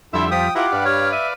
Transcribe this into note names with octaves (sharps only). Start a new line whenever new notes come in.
F2 D3 G3 E4 E5 C6
F3 G5 D#6 B6
E4 F4 G4 F#5 A#5 D6
G2 B4 D5 F5
C#5 F6
E5 D#7